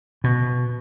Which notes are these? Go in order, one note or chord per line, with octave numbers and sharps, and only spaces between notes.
B2